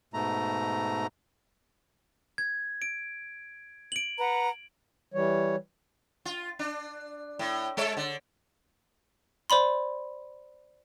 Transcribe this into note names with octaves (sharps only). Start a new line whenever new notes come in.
G#2 B2 A3 A#5
G#6
D7
D7 F#7
B4 F#5 A#5
E3 G3 C#5
F4
D4
A2
G#3 A4 C#5
D3
C5 D5 B5 C6